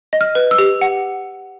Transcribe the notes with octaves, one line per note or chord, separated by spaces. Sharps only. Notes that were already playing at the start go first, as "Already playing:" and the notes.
D#5
F6
B4
E6
G4
F#5